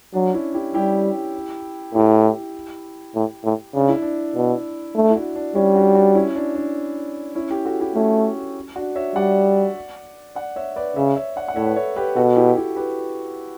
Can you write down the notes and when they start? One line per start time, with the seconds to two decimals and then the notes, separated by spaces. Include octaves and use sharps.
0.14 F#3 D4
0.34 C#4 E4
0.54 E4 G4
0.74 G3 E4 G4
1.94 A2 E4 G4
3.15 A2
3.44 A2
3.74 C#3 D4
3.89 E4
4.02 D4
4.35 B2
4.95 A3 D4
5.10 E4
5.15 D4 F#4
5.35 D4
5.55 G3 C#4 E4
5.75 D4 F#4
5.95 D4 F#4
6.15 C#4 E4
6.36 D4
6.55 D4
7.35 C#4 E4
7.50 E4 G4
7.65 F#4 A4
7.80 E4 G4
7.95 A3 C#4 E4
8.76 D4 F#4
8.96 C#5 E5
9.16 G3 D5 F#5
10.35 D5 F#5
10.56 C#5 E5
10.76 B4 D5
10.96 C#3 C#5 E5
11.16 C#5 E5
11.36 D5 F#5
11.48 F#5
11.56 A2 C#5 E5
11.66 B4
11.76 A4 C#5
11.96 G4 B4
12.16 B2 F#4 A4
12.36 E4 G4
12.56 E4 G4
12.76 G4 B4